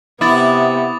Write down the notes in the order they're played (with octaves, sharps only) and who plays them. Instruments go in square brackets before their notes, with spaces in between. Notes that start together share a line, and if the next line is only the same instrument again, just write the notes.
[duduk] C3 [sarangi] B3 [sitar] E4 [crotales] D6 D#6 A6